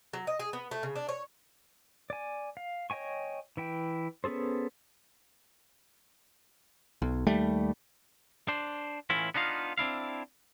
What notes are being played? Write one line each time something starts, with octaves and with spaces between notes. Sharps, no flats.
F#3
D#5
G#4
B3
A3
C#3
D4
C#5
D5 G#5
F5
C#5 D#5 G5 G#5 C#6
E3 E4 G5
B3 C#4 G#4 A4 C5
B1
D#2 G3 A3
D4 C5
A2 E3 C#4 E4 F4
B3 D4 D#4 F4 F5
C4 D4 E4 F5